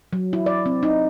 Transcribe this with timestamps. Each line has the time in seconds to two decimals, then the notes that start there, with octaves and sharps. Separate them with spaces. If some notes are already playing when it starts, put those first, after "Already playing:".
0.13 F#3
0.33 E4
0.46 D5
0.66 C4
0.83 D#4